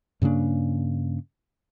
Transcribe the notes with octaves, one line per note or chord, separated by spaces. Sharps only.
G2 C#3 A#3 D4